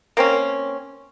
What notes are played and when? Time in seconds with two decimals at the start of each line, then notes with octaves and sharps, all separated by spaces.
0.17 A#3 C4 C#4